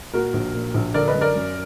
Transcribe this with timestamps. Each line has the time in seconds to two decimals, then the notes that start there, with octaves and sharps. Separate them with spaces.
0.14 A#2 F#4 A#4
0.34 A#1
0.54 A#2
0.74 A#1
0.94 D3 A#4 D5
1.08 B4 D#5
1.14 F#2
1.21 A#4 D5
1.35 F#2